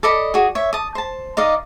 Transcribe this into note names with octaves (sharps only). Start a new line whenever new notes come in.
A4 D5 D#5 B5
F#4 G#4
C#5 E5
A5 D#6
C5 A5
D#4 D5 D#5 F5